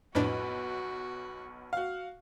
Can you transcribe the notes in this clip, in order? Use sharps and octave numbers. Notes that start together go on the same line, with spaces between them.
B1 F2 A2 D4 F#4 B4
F#4 F5